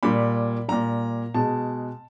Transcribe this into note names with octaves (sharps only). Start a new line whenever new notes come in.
A#2 G3 B5
A#2 G3 A#5
B2 G#3 A5